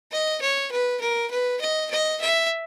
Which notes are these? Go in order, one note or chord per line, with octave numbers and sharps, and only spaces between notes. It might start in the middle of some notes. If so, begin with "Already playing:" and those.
D#5
C#5
B4
A#4
B4
D#5
D#5
E5